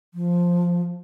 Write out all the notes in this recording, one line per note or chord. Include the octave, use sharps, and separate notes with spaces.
F3